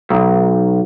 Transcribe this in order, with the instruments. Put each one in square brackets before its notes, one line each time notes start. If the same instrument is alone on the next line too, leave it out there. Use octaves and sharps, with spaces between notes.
[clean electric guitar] B1